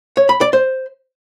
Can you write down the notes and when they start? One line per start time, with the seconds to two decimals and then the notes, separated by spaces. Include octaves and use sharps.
0.17 C#5
0.29 B5
0.41 D5
0.53 C5